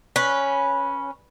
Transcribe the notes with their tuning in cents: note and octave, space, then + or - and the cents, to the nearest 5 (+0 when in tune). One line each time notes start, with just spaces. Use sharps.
C#4 +0 B4 -15